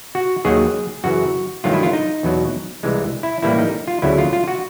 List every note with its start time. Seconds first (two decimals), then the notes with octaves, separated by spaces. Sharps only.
0.15 F#4
0.45 D#2 D#3 F#3 G#4
1.04 F#2 C#3 E3 F#4
1.64 G2 D#3 F#3 A3 F4
1.73 E4
1.83 F4
1.93 D#4
2.23 E2 B2 F#3
2.83 C2 C3 E3 G#3
3.23 E4
3.42 A2 E3 G3 A#3 E4
3.58 D#4
3.87 F4
4.02 D2 C#3 F#3 A3 E4
4.18 F4
4.33 F4
4.48 F#4